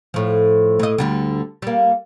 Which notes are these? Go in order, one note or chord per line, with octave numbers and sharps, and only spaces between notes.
A2 F3
A2 D#5
D2 D3 G3
G3 A#3